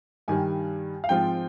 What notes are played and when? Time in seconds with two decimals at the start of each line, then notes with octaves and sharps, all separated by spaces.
0.28 G2 D#3 G3 G#5
1.04 F5
1.09 G#2 F3 C4 F4 G5